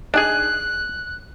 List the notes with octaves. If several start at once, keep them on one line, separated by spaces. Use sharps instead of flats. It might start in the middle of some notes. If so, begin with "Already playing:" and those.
D4 D#4 G#4 G#5 F#6